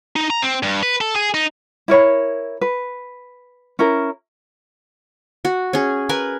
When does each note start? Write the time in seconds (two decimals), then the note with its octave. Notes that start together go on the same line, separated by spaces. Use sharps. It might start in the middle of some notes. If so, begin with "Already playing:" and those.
0.16 D#4
0.30 A#5
0.42 C4
0.63 G2
0.83 B4
1.01 A4
1.16 G#4
1.34 D#4
1.88 E4 A#4 C#5 B5
2.61 B4
3.79 C#4 E4 A#4
5.45 F#4
5.73 C#4 G#4
6.09 A#4 B4 G#5